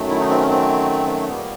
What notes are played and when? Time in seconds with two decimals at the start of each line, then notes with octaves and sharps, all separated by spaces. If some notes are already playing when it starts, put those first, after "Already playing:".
Already playing: F#2 D#3 F#3 A3
0.10 E4
0.20 D#4
0.30 C4
0.40 C#4
0.50 C4
1.28 A#2 G3 A#3 B3